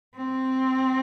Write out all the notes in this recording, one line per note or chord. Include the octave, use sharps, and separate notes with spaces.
C4